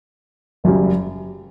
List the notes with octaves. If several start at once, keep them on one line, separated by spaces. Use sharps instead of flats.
F#1 F#2 C#3 G3